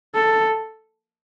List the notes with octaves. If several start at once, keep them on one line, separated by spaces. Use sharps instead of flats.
A4